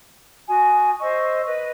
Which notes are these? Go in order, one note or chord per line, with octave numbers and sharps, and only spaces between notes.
F#4 G#5 D#6
C5 D#5 C#6 E6
B4 D#5